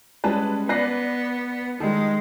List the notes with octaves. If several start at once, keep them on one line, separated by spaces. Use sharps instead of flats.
G3 G#3 C#4 B4 D5 A5
B3 B4 D5 F#6 A#6 C7
D#3 G3 G#3 D#4 A4